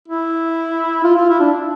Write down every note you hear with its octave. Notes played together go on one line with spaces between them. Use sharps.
E4
F4
F4
E4
D4